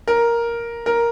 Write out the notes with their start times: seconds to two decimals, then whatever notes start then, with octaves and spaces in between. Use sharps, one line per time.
0.08 A#4
0.86 A#4